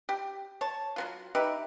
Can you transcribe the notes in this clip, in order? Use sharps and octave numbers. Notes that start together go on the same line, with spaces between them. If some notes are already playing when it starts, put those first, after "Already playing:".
G4
C#5 A5
F#3 B3 F4
D#4 G4 B4 E5